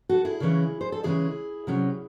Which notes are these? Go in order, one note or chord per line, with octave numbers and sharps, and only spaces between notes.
F#4 A4
E4 G#4
C#3 E3 G#3 C#4
C5
A4
C#3 E3 G#3 C#4 E4 G#4
C3 F#3 C#4